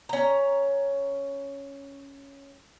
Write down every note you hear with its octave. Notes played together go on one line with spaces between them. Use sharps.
C#4 A#5